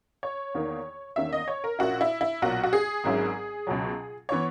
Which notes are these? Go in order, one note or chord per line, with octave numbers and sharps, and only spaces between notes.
C#5
E2 D#3 A#3 D#4
E2 D#3 A#3 C#4 E5
D#5
C#5
A#4
A#1 A#2 A#3 C#4 E4 F#4
E4
E4
B1 A#2 F#3 F#4
F#4
G#4
G#1 G#2 F#3 C#4 E4
C#2 B2 F#3
E3 B3 C#5